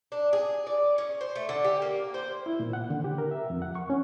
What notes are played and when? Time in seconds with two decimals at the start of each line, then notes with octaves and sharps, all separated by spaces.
0.12 D4
0.33 G#4
0.67 D5
0.98 C#4
1.21 C5
1.36 A3
1.49 D3
1.64 G4
1.82 A#3
2.14 C5
2.46 E4
2.60 A#2
2.73 F#5
2.90 D3
3.04 G4
3.18 A#4
3.31 E5
3.50 F2
3.62 F#5
3.75 C#6
3.90 C#4